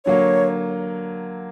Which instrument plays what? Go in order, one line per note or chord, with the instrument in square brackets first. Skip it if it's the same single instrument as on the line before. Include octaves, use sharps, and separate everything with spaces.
[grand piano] D3 F#3 A#3 [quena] C#5